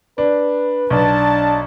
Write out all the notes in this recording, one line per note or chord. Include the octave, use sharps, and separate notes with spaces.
D4 B4
B1 D4 A5